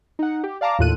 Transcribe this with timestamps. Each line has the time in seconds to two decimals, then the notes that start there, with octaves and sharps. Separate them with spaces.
0.19 D#4 F#5
0.44 G4
0.61 D5 F5 A5 A#5 D6
0.79 D#2 A2 F4 A4 F#6 D#7